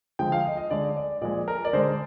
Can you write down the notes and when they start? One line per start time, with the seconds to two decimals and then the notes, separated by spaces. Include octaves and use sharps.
0.19 D3 F3 G#3 G5
0.32 F5
0.45 D#5
0.57 D#5
0.70 D3 G#3 D5
0.96 D5
1.21 A#2 F3 G#3 D5
1.48 A#4
1.65 D5
1.73 D3 G#3 C5